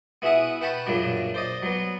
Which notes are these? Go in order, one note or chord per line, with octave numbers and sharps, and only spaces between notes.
B3 E4 F#4 G#4 E5 F#5
B4 F#5 G5 A5 B5 C#6
F#2 A#2 C#3 F#3 D4
C5 D5 D#5
F#3 B3